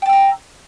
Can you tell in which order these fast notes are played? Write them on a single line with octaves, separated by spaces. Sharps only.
G5 A5 E6 A#5